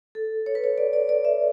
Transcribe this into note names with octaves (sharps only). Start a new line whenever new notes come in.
A4
C#5
B4
C#5
D5
D5
D5
E5